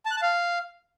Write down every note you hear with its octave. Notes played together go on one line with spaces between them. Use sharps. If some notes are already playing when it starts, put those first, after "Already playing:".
A5
F#6
A5
F5